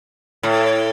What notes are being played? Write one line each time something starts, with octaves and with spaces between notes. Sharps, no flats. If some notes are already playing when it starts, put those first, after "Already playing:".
A2